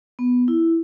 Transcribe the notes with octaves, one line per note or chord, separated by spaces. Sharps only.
B3
E4